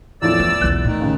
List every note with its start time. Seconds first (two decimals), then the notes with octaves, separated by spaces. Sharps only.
0.22 E2 A2 F3 D5 E6
0.40 E3
0.61 B1 E2 F#6
0.85 A2 D#3
1.00 D#2 C#3